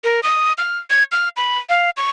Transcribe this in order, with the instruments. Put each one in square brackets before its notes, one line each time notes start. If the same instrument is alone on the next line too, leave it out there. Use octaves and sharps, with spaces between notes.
[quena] A#4
D#6
F6
G#6
F6
B5
F5
C#6